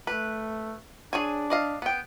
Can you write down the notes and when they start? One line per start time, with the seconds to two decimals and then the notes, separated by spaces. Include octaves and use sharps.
0.07 A3 B4
1.13 D4 G#4 C#5 G#5
1.50 D5 D#5 F5
1.82 B3 G5